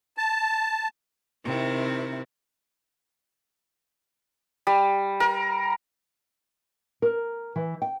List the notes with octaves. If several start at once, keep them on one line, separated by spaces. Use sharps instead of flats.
A5
C3 D#3 C4 E4
G3
A#4
A#4
E3
G5